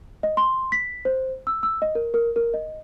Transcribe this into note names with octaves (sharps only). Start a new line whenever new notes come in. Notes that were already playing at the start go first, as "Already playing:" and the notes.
D#5
C6
B6
C5
E6
E6
D#5
A#4
A#4
A#4
D#5